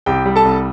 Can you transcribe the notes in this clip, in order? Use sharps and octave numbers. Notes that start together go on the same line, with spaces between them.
C2 G4 G5
G3
A4 A5
C2